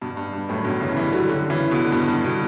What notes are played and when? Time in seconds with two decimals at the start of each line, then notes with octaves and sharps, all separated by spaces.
0.01 G2 B2
0.17 G2
0.33 G2
0.49 F#2 A2
0.65 G2 B2
0.81 C#3 E3
0.97 E3 G3
1.12 D3 F#3
1.29 D3 F#3
1.50 C#3 E3
1.71 B2 D3
1.92 G2 B2
2.08 G2
2.25 B2